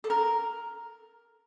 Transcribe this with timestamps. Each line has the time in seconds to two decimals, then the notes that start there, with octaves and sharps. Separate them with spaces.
0.04 A4
0.10 A#4